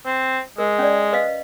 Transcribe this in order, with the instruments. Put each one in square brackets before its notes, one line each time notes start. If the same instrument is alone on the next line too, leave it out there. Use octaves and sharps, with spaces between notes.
[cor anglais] C4
[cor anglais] G#3 [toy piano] A#4
[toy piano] C#4 D5
B4 D#5 F5